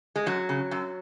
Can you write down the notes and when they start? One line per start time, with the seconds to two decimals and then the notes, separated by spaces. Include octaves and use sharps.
0.16 G#3
0.26 F#2 F#3
0.49 C#3
0.71 F#2